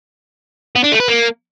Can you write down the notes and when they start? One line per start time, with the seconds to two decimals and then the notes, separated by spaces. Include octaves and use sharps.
0.75 B3
0.84 D4
0.92 A3
1.00 B4
1.08 A#3